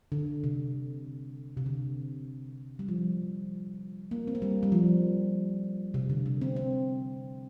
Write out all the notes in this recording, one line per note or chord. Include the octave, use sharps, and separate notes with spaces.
D3
C3
C3
D3
G3
F3
A#3
C4
A#3
G3
G3
F3
C3
D3
C3
C4
C4